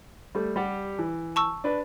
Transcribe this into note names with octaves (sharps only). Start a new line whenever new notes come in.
G3 A3
G3 G4 F#5
E3
A5 C#6 E6
D4 B4